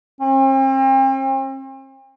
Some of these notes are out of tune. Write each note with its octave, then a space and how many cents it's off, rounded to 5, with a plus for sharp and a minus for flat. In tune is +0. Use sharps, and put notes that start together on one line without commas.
C4 +40